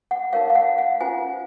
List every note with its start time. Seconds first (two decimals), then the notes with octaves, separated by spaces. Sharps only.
0.11 F#5
0.33 D#4 A#4 C#5 F5
0.50 F5
0.55 F#5
0.78 F#5
1.00 C#4 F4 C5 G#5